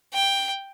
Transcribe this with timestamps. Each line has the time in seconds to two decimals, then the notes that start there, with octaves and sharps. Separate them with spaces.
0.14 G5